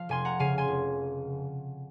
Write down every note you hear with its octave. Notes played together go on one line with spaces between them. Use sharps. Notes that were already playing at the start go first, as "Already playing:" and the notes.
Already playing: F3 F5
F1 G#5 C6
F#5 A#5
C#3 F5 G#5
G#5 C6
F1